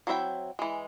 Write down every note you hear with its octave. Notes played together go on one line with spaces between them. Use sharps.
F#3 C4 E4 E5 G5
E3 G#3